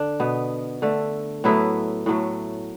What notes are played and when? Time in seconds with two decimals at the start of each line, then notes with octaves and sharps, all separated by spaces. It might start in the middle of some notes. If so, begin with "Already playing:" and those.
Already playing: D3 D4
0.20 B2 B3
0.82 D3 A3
1.44 A2 F#3 A3 B3 E4
2.06 A2 F#3 A3